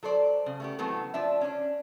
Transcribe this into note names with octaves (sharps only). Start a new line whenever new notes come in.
F#3 A4 C5 D5
C#3
A3 B3 G4
C#3 E3 F#3 A3 B3 C4
F3 D4 E5
C#4 D4